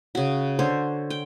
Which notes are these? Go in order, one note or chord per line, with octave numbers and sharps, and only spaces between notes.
C#3 F#4
D3 C5 C#5
G5